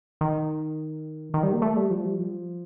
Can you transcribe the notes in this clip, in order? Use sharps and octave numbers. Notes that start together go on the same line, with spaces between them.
D#3
D#3
G3
A#3
A3
G3
F3
G3
F3